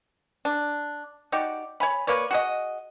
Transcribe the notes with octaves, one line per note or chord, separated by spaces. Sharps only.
D4
D#4 F#4 G4 D5
C#5 G#5 B5
A#3 B4 C#5 D5
F#4 G#4 D#5